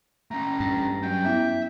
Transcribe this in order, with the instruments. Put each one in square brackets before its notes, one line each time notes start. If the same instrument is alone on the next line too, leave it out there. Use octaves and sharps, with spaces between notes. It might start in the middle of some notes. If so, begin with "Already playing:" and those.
[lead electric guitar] A3 C#4 [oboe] A#5
[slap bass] G2
[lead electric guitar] F#3 C#4 [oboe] G5
[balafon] B3 C#4 E4 [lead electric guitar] E5